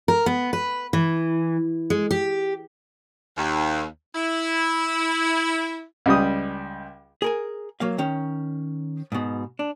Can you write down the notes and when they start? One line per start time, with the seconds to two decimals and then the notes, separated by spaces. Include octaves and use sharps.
0.08 A#4
0.26 B3
0.53 B4
0.93 E3
1.90 G#3
2.11 G4
3.37 D#2
4.15 E4
6.06 C#2 G3 D#6
7.22 G#4 A#4 G#5
7.80 F#3 A#3 F5
7.98 D#3 C#4
9.12 G#2 B2
9.59 D4